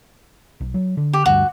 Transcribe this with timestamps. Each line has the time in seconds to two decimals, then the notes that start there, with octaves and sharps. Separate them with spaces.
0.61 B1
0.74 F#3
0.97 D3
1.13 G4
1.26 D2 G2 F#4